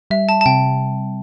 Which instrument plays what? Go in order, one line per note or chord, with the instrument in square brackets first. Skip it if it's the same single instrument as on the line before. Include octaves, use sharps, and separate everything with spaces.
[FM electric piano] G3 [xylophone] E5
[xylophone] A5
A5
[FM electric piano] C3 [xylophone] G5